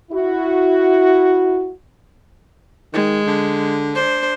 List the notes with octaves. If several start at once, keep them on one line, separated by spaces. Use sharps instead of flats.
E4 F#4
D#3 G#3
D3
D4 C5